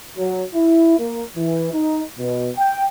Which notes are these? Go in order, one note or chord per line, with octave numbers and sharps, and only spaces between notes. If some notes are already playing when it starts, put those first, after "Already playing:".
F#3
E4
A#3
E3
D#4
B2
G5